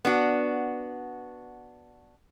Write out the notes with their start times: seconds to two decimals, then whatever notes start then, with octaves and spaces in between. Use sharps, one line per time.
0.05 B3 D4 F#4